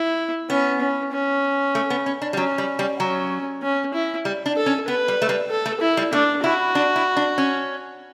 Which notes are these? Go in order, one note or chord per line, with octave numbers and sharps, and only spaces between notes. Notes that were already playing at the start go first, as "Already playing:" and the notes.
Already playing: E4
B3 C#4
C#4
C#4
A3
B3
C#4
D4
G3
F#3 C#4
G3
G3
F#3 C#4
C#4
E4
G3
D4
A4
C#4
B3 B4
G3
A3
G3
A4
A3
E4
G3
A3 D4
E4 F#4
D4
E4
D4
C#4